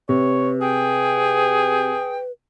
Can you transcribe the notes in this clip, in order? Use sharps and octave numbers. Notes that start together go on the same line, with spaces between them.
C3 B4 C#5
G#4 G5